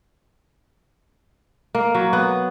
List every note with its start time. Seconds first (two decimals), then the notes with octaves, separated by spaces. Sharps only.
1.75 A#3
1.95 F#3
2.13 B3